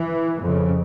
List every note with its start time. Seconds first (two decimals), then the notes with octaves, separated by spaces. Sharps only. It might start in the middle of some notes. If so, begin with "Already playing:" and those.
Already playing: E3
0.42 F2 C#3